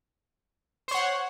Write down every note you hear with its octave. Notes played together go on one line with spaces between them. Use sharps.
C5 C#5 F#5